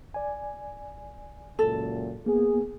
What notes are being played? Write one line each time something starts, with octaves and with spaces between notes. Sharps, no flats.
D5 G#5
C#2 F#2 A#2 A4
A#3 B3 G#4